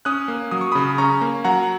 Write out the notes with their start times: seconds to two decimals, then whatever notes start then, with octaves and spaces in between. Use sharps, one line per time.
0.05 C#4 D#6 F#6
0.28 A#3
0.51 F#3 D#6
0.61 C#6
0.72 C#3 B5 D#6
0.98 C#4 A#5 C#6
1.21 A#3
1.44 F#3 F#5 A#5